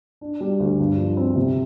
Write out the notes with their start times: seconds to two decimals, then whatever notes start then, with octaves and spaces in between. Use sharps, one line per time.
0.21 D4
0.41 G3
0.60 D2
0.80 G2
0.98 F3
1.17 C4
1.36 C3